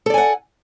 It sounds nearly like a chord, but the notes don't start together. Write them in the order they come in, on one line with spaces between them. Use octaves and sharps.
A4 D5 G#5 F#5